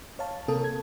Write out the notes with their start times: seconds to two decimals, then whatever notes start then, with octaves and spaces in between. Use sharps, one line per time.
0.19 C#5 F5 A5
0.48 C3 A#3 A4 A#4 A5 D#6
0.64 G#6